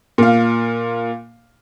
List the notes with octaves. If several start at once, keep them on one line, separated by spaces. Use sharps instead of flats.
A#2 F5